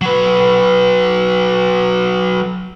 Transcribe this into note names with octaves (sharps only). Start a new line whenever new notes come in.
F#3 B4